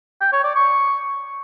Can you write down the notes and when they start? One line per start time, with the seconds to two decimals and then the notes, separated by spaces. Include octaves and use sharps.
0.21 G5
0.32 C#5
0.44 D5
0.55 C#6